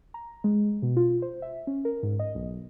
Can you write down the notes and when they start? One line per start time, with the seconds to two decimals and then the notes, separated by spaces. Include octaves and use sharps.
0.14 A#5
0.44 G#3
0.82 B2
0.97 F4
1.22 C5
1.42 E5
1.67 C#4
1.85 A#4
2.03 G#2
2.19 D#5
2.35 B1